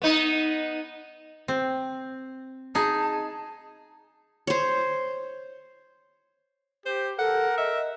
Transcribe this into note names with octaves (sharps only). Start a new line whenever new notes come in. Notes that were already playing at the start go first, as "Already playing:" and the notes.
B3 D#4
C4
D#4 G#4 A5
C5 C#5
G4 C5
A4 A#4 F#5
D#5 E5